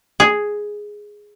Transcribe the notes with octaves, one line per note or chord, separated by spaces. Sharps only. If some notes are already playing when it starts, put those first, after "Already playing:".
G#4